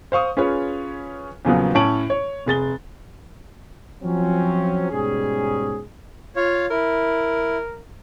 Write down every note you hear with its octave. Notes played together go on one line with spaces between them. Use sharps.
C5 F5 C#6 D#6
C#4 F4 G#4 B4 C#5
E2 A#2 C#3 F3 F#3 B3
A2 C#4 C#5 A5 D7 F#7
C#5
F1 G#4 A6 G7
F3 F#3 C4 C#4
G#2 B2 G3 C#4 G#4
F4 C#5 F5
E4 A#4